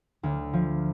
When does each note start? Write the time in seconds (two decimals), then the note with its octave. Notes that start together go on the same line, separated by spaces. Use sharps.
0.23 D2
0.53 F3